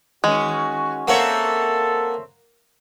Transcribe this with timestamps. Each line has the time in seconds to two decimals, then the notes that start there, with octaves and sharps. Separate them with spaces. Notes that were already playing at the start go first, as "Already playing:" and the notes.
0.24 D#3 G#3 C#4 F#4
1.08 A#3 C4 A4 C#5 E5 F#5